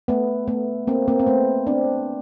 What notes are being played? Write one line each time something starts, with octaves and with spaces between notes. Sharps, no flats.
A3 B3
A3 B3
A#3 C4
A#3 C4
C4
A3 B3
C4 D4